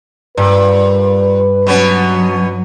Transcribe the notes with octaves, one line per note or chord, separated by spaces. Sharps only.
G2 A#2 B4
B2 F#3 B3 C#4